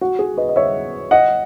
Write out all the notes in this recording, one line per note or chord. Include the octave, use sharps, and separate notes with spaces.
F#4
G#4
B4 D#5
D#5
C#5 E5
D#5 F#5